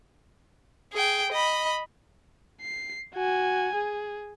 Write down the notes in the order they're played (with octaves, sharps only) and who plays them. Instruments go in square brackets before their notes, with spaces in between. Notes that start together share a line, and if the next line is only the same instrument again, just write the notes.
[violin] G#4 G5
D#5 B5
[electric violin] C7
F#4 G#5
G#4